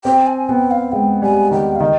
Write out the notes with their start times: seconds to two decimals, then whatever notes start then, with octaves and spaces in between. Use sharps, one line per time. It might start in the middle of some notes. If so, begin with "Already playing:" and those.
0.04 C4 G5
0.27 G#5
0.49 B3 G5
0.71 F5
0.92 G#3 G5
1.22 G3 G#5
1.51 D#3 G5
1.76 F5
1.80 D#3 D#5